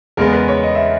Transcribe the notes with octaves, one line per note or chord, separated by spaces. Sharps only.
E2 C#3 G#3 B3 A#4
B4
C#5
D#5
E5